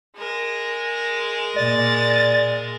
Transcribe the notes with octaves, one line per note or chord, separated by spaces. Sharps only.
G#3 A#4
A#2 D5 A6